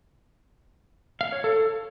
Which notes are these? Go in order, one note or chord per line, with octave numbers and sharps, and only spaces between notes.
F5
C#5
A4